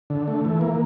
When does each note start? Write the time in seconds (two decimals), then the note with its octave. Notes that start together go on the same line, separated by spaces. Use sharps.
0.10 D3
0.28 A3
0.45 E3
0.61 A#3